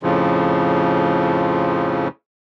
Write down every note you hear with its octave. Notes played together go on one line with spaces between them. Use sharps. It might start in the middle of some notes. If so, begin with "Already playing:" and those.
F2 A2 C#3 F3